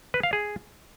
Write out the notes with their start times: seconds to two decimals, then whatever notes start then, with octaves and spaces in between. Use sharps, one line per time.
0.14 B4
0.23 F5
0.33 G#4